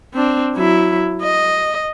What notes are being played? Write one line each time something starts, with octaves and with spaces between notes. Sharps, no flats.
C4 D4
F#3 E4
D#5